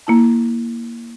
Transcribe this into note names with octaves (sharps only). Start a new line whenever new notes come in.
A#3 E4 A5